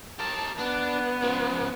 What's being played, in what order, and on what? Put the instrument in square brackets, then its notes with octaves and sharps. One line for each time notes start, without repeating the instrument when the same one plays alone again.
[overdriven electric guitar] G4 A#4 [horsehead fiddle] A5
[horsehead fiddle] B3 [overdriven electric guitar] D4
[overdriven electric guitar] C#3 F3